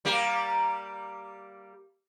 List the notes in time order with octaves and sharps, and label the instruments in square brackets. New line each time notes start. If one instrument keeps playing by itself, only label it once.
[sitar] G3 A#3 G4